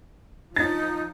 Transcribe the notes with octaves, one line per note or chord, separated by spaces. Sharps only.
F3 D#4 A6